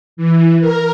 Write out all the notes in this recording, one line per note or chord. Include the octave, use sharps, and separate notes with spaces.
E3
A#4